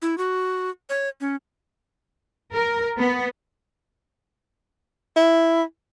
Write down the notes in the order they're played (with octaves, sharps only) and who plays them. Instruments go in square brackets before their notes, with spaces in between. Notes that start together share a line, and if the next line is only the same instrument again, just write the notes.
[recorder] E4
F#4
C#5
C#4
[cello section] A#4
B3
[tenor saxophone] E4